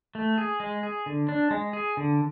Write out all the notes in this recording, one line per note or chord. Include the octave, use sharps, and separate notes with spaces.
A3
G#4
G#3
G#4
D3
D4
G#3
G#4
D3